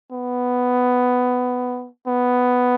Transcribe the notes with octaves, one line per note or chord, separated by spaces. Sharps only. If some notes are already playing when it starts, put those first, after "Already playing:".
B3
B3